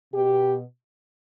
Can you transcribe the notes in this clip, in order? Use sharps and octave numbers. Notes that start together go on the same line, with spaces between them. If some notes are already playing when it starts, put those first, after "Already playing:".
B2 G4